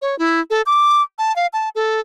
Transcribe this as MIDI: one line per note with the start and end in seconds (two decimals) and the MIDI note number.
0.02 0.18 73
0.19 0.40 64
0.50 0.62 69
0.66 1.02 86
1.19 1.35 81
1.36 1.47 77
1.53 1.69 81
1.75 2.00 69